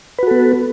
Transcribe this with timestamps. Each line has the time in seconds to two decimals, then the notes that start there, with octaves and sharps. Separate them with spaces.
0.18 B4
0.23 F#4
0.27 A4
0.31 B3